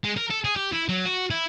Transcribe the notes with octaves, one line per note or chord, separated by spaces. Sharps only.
G#3
A#4
A4
G#4
G4
E4
F#3
F#4
E4